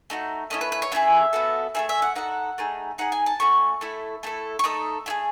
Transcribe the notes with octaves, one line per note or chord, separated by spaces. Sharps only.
A3 D#4 F#4
A3 C#4 E4 D#5
B4
B4
C#5
A3 C#4 E4 G#4 E5
B3 F#4 A4
A3 D#4 G#4 E5
E5
F#5
D#4 F#4 A4 F#5
A3 D#4 G#4
D#4 G#4 F#5
G#5
A5
A3 C#4 F#4 C#6
A3 E4 A4
A3 E4 A4
C#6
A3 D#4 A4 D#6
A3 E4 G#4